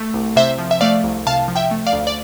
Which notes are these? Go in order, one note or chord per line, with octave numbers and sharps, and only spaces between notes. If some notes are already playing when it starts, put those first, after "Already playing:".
Already playing: A3
C2
C3 C5 E5
F3
E5
A3 D5 F5
C2
C3 F5 A5
F3
E5 G5
A3
D5 F5
D2
D5